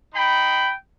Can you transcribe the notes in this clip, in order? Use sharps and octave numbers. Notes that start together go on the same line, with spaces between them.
D#4 G5 B5